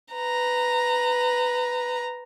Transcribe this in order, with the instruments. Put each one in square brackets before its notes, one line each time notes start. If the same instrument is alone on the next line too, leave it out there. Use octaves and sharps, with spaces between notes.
[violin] B4 A#5